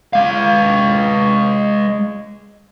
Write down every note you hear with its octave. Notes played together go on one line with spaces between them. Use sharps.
G#3 F5